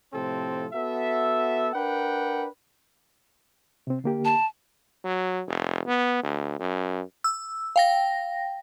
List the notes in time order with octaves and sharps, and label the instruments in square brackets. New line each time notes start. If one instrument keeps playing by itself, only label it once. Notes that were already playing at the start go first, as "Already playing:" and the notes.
[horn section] A2 C3 F3 C4 A4
B3 F#4 A4 E5
D4 A#4 B4 F#5 G5
[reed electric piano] C3 C4
D3 A#3 G4
[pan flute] A5
[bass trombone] F#3
F1
B3
D2
F#2
[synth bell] E6
F5 G5 A#6